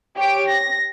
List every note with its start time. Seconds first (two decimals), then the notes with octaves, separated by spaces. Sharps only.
0.17 G4 C#5 D7
0.48 A#6